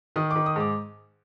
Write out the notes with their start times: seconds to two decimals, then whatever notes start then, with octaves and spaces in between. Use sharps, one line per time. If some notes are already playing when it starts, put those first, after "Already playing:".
0.16 D#3 D#6
0.31 D6
0.36 D#3
0.46 D#6
0.56 G#2 D6